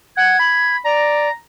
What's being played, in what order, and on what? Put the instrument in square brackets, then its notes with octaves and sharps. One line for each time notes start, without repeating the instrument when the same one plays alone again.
[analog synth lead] F#5 [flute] G#6
[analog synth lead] B5
[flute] D5 [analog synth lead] A#5